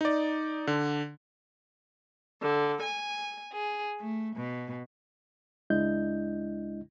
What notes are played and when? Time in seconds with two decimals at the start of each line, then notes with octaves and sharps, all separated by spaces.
0.01 D#4 D5
0.67 D3
2.42 D3
2.82 G#5
3.53 G#4
3.99 A3
4.35 B2
5.70 C#2 G#3 D4 E4 D#5 G6